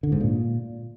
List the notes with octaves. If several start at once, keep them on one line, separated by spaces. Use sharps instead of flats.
D3
G#2
A#2